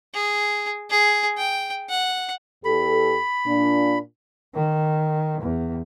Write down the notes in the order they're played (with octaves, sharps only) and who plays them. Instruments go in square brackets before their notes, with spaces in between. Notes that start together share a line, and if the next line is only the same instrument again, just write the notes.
[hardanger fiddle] G#4
G#4
G5
F#5
[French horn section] E2 G4 A4 [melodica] B5
[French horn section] A#2 D4
[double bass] D#3
E2